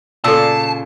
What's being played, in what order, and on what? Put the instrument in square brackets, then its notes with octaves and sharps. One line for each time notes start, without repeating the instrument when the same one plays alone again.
[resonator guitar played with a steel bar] A#2 C#3 F4 [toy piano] A4 E6 [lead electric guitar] A5